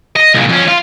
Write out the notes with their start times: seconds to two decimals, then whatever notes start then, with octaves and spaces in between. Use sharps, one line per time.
0.16 D#5
0.34 C2 A#2
0.49 F2 C#4
0.68 F4